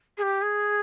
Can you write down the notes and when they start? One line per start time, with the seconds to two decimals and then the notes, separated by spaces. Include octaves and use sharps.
0.17 G#4
0.22 G4
0.42 G#4